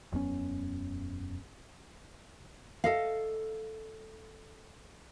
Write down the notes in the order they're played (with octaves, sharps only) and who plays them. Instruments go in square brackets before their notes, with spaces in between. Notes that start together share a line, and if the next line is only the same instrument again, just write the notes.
[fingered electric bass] E1 F#2 B3 C#4
[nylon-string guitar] A4 D#5 F5